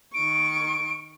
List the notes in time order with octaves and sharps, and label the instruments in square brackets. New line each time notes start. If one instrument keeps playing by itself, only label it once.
[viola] D#3 C#6 [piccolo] D7